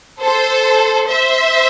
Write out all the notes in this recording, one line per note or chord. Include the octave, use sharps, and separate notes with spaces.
A4 C5
C5 E5